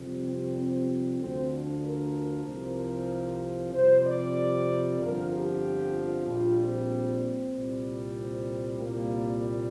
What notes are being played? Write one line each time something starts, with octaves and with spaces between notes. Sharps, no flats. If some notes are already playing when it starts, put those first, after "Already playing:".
Already playing: F2 C3 G3
C4
C4
D2 D3 F3 C4
D4
A#4
C2 C3 F3
F2 C3 G3 C5
D5
G1 F2 F3 A#4
G4
A#1 A#2 G3 F4
C4
C2 A#2 G3
C4
C2 A#2 G3 A#3